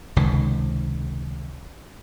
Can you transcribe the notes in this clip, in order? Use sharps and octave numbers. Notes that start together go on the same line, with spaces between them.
F1 C#2 D#3